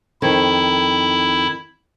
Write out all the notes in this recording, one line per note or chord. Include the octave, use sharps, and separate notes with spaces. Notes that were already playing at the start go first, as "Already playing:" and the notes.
F2 D#3 E4